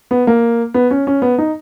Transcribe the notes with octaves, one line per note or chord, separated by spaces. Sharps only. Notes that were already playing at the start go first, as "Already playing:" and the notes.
B3
A#3
B3
C#4
C#4
B3
D#4